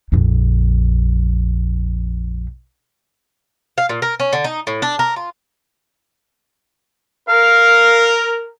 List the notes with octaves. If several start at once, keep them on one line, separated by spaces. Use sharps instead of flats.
A#1 F2
F5
A#2
A#4
C#4
D3
D#4
A2
D4
A#4
F4
A#4 F5